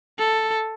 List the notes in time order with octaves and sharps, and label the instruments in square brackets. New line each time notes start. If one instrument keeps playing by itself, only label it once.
[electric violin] A4